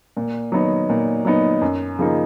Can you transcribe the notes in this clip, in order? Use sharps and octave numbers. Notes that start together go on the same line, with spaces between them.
A#2
F#3 B3 D#4
A#2
F#3 B3 D#4
F#2
C#3 F3 A#3 D#4